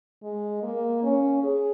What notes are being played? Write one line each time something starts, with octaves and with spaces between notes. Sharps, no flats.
G#3
A#3
C#4
G#4